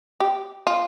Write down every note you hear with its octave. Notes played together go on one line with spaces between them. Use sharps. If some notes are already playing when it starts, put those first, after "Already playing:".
G4
F4